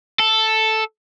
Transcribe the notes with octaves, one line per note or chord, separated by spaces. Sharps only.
A4